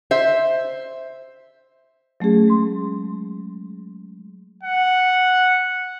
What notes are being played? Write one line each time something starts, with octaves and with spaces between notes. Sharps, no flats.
C5 E5
F#3 A3 C#4 G#4
G#3 A3 C6
F#5